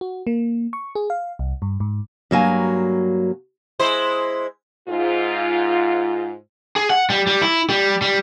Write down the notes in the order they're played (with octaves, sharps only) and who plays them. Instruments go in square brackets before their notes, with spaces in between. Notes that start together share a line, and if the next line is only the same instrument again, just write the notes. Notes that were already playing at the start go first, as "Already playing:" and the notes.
[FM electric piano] F#4
A#3
C#6
G#4
F5
C2
G2
G#2
[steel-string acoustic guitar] G2 F#3 A#3 G#5
[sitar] G#3 E4 C5
[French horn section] G#2 F4
[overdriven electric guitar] G#4
F#5
G3
G3
E4
G3
G3